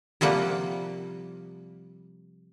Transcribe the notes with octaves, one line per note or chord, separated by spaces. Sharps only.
C3 F3 G3 A#3 F#5